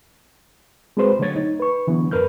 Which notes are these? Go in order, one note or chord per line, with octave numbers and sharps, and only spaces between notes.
G#3 C4 F#4 G#4 B4 C5
D3 F#3 A3 C#5 G#6 A6
D#4
B4 C#6
D3 E3 F#3 B3
F#2 A#4 B4 F6 G6